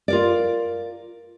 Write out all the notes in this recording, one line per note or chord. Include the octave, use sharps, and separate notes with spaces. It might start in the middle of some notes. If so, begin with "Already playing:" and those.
F4 A#4 D5